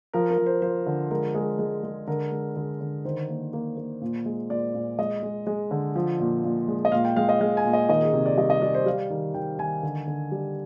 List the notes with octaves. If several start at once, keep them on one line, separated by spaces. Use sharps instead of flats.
F3 A#4
A#4
F3
C5
F3 C5
D3
G#3 A#4
G#3 G#4
G#3
G#3
D3 A#4
G#3
D3 G#4
D3
D#3 C5
A#3
A#3
A#3
A#2
G#3
A#2 D5
A#2
G#3 D#5
G#3
G#3
D3
F3
A#2
A#2
G#3
D#5
A#2 F5
G5
G#3 F5
D#5
G#3 F5
G#5
A#2
D#5
D#3 D#5
G#4
C3
D5
G3 D#5
D#5
G3 D5
C5
G3 F5
D#3
D#3 G5
D#3 G#5
D3
D3
G3